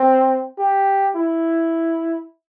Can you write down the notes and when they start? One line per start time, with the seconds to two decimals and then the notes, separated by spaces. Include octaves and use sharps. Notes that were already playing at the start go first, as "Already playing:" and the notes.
Already playing: C4
0.58 G4
1.16 E4